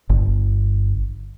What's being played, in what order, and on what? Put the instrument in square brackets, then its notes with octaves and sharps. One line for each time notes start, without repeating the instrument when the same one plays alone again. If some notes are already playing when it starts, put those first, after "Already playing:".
[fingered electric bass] G1